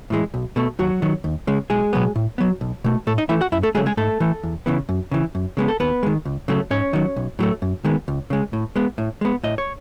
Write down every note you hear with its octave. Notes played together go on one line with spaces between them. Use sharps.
A2 E3 G#3
B1
B2 A3
D#2 F#3 F#4
D#3 F#3
D#2
C#3 G#3
B1 G#3 G#4
B2 F#3 B3
A2
F#3 B3
B1
B2 A3
A2 A3 A4
D#4 D#5
E3 A3 E4 E5
F#4 F#5
F#2 E4 E5
A3 A4
C#3 F#3 G#3 A3 G#4
G#3 G#4
G#2 A3 A4
E3 A3
E2
C#3 E3 B3
F#2
C#3 E3
F#2
C#3 G#3 B3
A4
D#2 B3 B4
D#3 G#3
C#2
C#3 F#3 A3
G#2 C#4 C#5
D#3 F#3
B1
A2 F#3 A3
F#2
D#3 G#3 B3
C#2
C#3 G#3
A2
G#3 B3
A2
G#3 B3
A2 D#5
C#5